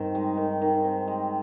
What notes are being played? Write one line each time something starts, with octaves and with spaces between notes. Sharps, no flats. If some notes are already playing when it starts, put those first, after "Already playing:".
Already playing: G2 D#3 C4
G#3
D#3
D#3
C4
G#3